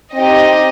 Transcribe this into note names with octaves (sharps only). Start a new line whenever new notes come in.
C4 D#4 G4 D#5